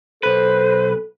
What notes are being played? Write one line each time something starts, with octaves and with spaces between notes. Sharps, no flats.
B1 A4 B4 C5